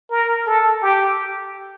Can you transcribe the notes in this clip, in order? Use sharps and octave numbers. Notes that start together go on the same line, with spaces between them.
A#4
A4
G4